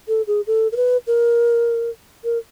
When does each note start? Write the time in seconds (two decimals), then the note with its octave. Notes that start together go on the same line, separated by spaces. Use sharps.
0.08 A4
0.27 G#4
0.47 A4
0.72 A#4
0.76 B4
1.07 A#4
2.24 A#4